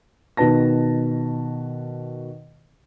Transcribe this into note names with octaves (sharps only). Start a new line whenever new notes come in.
B2 D#3 B4 A5 A#6